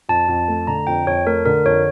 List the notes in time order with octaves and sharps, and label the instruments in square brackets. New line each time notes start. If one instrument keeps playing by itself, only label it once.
[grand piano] F2 [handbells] A5
[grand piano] F2
A3
[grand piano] D3 [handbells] A#5
[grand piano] F2 [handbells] G5
[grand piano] F2 [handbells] C#5
[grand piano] A3 [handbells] A#4
[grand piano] D3 [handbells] A#4
[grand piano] F2 [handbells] C#5